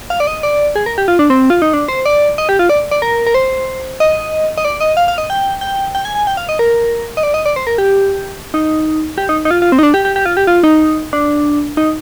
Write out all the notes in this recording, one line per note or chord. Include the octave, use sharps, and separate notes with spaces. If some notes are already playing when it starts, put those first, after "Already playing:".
F5
D5
D#5
D5
G#4
A#4
G4
F4
D4
C4
F4
D#4
D4
C5
D5
D#5
G4
F4
D5
D5
A#4
A#4
C5
D#5
D#5
D5
D#5
F5
F5
D#5
G5
G5
G5
G#5
G#5
G5
F5
D#5
A#4
D#5
D5
D#5
D5
C5
A#4
G4
D#4
G4
D#4
D#4
F4
F4
C4
D#4
D4
G4
G4
G4
F4
G4
F4
D#4
D4
D#4